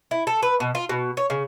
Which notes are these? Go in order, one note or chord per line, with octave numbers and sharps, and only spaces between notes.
E4
A4
B4
B2
F4
B2
C#5
C#3